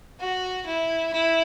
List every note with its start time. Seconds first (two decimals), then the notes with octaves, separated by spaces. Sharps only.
0.20 F#4
0.66 E4
1.13 E4